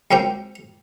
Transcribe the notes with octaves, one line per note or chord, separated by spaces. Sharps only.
C#2 F#3 A#3 C4 G5